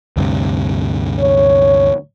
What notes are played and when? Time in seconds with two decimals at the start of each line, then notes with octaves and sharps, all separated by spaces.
0.16 D2 G2 C3
1.20 C#5